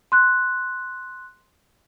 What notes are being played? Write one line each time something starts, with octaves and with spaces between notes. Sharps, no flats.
C6 F#6